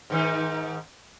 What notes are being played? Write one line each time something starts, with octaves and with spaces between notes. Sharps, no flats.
G#2 D#3 D#4